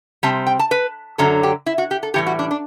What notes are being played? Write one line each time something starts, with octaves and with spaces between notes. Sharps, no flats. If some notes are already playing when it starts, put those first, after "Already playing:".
C3 G3 C4 A5
G5
A5
B4
F#2 D3 F#3 A4
G4
E4
F#4
G4
A4
A2 E3 G3 G4
F#4
D4
D4